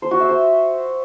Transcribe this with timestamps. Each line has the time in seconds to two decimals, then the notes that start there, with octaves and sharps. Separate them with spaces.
0.02 C5
0.11 F#4
0.20 E5
0.29 C5